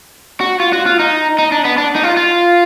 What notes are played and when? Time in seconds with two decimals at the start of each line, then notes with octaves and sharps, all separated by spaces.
0.41 F#4
0.60 F4
0.73 F#4
0.86 F4
0.99 D#4
1.39 D#4
1.52 D4
1.65 B3
1.78 D4
1.95 D#4
2.04 F4
2.17 F4